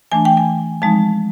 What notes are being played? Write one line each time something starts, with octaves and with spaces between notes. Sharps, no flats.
E3 A3 D4 G#5
G5
G#5
F3 G#3 C4 D#4 A5